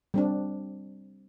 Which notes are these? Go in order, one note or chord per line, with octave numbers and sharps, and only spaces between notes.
G3 C4 D4